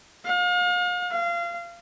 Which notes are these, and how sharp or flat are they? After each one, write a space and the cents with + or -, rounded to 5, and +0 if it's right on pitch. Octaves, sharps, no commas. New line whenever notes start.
F5 +40
F5 -25